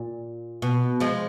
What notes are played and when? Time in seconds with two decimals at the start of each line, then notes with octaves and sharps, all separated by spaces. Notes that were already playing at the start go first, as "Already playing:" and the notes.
Already playing: A#2
0.62 B2
1.00 F3 G#3